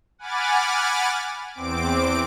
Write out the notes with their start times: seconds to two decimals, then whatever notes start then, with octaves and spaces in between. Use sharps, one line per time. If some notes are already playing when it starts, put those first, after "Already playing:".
0.19 F#5 G#5 B5 D6 F6 A6
1.53 E2 C4 D6 D7